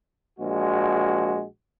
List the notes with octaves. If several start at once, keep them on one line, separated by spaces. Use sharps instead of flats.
A#1 G#3 F#4